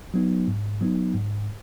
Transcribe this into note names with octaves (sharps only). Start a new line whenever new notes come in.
F#3 B3 D#4
G#2
F#3 B3 D#4
G#2